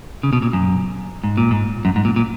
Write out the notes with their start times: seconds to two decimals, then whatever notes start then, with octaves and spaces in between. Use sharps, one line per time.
0.23 C#3
0.33 B2
0.42 A#2
0.53 F#2
1.24 G#2
1.37 A#2
1.51 G#2
1.85 F#2
1.96 G#2
2.05 A#2
2.16 A#2